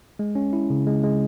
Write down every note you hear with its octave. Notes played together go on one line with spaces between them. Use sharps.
G#3
C#4
E4
C#3
G#3
G#3